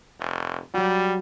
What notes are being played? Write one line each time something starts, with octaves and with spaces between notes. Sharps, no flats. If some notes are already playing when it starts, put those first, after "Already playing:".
F1
F#3 G3 F#4